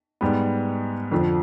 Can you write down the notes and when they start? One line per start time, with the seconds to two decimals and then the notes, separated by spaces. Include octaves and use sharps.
0.21 G#2 G3 B3
1.11 F2 D3 F3